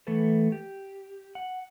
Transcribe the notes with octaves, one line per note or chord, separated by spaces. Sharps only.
E3 A3 B3 A4 B4
G4
F#5